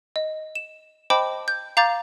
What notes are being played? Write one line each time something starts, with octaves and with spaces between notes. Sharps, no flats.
D#5
E7
C5 D#5 G5 A5 B5 D6
G6
F5 A#5 D6 G6 A6